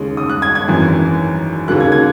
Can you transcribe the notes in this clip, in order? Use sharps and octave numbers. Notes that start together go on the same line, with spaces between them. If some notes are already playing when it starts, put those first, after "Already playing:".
Already playing: D#2 C#3 G#3
D#6
F#6
G#6
G#6
G#1 F#2 E3
D#2 C#3 F#3 A#3 F#6
G#6
G#6